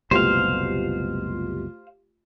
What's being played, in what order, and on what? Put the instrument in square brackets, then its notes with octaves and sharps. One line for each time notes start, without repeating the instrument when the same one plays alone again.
[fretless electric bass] F#1 C2 B2 [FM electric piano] A3 F4 G4 [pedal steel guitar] C5 F5